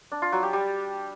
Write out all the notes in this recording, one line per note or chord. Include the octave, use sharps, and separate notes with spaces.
D4
F4
F#3
G4
G3